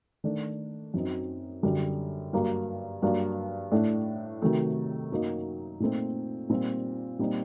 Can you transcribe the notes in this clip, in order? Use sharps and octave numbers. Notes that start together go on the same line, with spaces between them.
D#3 A3 D4
F#2 F#3 C4 D#4
F#2 D3 G3
G2 F#3 A#3
G2 F#3 A#3 D4
A2 A3 D4
C3 D#3 F#3 A3
F#2 F#3 A#3 D#4
A#2 A3 C4 D#4
A#2 G3 C4 D#4
A#2 G3 C4 D#4